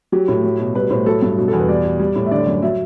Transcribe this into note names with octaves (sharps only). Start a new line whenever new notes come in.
F#3 G4
A2
F#3
B2
G3 B4
A2 C5
F#3 A4
G2
B2
A4
E2
B4
G3 D5
B2
G3
A2
E5
D3 D5
F#2
F#3 E5